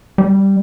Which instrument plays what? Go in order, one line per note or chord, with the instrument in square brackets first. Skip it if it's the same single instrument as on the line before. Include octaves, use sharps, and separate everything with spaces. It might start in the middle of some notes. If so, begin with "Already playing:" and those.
[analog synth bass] G3